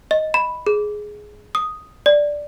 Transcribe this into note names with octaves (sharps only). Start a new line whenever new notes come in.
D#5
B5
G#4
D#6
D5